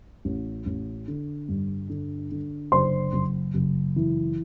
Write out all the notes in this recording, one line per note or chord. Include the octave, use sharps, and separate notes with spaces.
A1
A1
D3
G2
D3
D3
F#1 C5 C6
F#1
F#1
E3